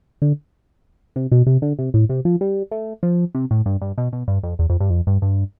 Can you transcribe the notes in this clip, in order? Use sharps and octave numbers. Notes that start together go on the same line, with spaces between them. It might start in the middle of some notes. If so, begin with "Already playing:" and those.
D3
C3
B2
C3
D3
C3
A2
C3
F3
G3
A3
F3
C3
A2
G2
G2
B2
B2
G2
F2
E2
F2
G2
F2
G2
G2